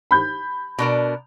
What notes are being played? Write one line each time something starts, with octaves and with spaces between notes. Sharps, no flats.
B5 G6
B2 D4 A#4